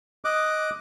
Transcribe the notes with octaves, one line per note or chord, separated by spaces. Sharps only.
D#5 D6 F#6